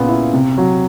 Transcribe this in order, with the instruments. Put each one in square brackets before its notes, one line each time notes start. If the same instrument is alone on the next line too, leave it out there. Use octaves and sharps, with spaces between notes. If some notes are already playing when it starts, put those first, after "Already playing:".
Already playing: [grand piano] A#2 C#3 B3
E4
C3
F#3